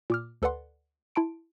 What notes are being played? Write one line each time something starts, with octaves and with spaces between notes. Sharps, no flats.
A#2 D6 F6
D2 A4 B4 D5 F#5 C6
E4 A5 C6 D7